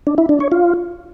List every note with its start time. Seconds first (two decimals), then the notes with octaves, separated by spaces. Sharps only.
0.07 D4
0.18 E4
0.29 D4
0.40 C#5
0.52 F4